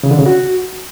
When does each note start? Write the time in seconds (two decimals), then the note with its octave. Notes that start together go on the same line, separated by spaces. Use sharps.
0.03 C#3
0.11 D3
0.18 C#3
0.26 F#4